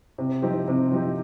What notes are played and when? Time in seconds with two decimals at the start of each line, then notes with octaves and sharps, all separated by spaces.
0.18 C3
0.42 F3 C4 D#4 G4
0.68 C3
0.92 F3 C4 D#4 G4